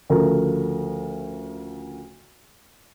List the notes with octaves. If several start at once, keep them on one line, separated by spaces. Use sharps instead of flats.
D2 C#3 F3 A3 A#4